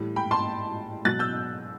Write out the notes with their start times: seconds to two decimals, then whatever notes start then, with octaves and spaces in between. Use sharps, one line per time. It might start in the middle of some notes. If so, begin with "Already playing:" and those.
Already playing: A2 E3 G3
0.16 G5 B5
0.31 A5 C6
1.05 B2 F#3 F#6 A6
1.19 E6 G6